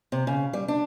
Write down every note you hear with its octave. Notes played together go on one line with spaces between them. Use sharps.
C3
C#3
G3
D4